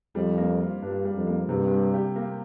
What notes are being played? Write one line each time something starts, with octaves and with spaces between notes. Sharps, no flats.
F2 G3
A#3
F4
G2 D4
G3
F2
A#3
G2 C3
G3
G4
A#3